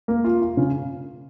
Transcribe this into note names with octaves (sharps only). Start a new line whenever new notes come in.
A#3
F4
F4
C#3